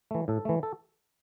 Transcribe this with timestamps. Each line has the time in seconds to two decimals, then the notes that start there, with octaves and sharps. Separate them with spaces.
0.11 E3 A3
0.28 A2 A4
0.45 E3 A3
0.63 A4